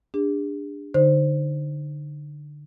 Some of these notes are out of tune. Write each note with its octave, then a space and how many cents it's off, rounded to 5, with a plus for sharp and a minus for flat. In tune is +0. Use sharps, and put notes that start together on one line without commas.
D4 +0 G#4 -45
D3 +5 D#4 +0 C5 +0